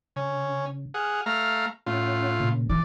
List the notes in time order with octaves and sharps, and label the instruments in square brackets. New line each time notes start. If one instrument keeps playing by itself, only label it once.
[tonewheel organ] C#3 [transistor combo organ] C#4
[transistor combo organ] G#4 F#5 [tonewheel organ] F6
[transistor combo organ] A3 F5 A#5
[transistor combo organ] A2 F4 [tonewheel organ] C#4 F#5
[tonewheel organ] A#2 C#3
[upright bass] C#3 E3 [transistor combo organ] D5